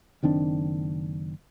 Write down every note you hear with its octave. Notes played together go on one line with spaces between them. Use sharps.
F#1 D#3 C4 D4